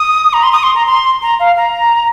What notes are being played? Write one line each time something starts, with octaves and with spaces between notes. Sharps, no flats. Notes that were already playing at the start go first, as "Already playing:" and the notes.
Already playing: D#6
A#5
C6
D#6
C6
A#5
C6
A#5
F5
A#5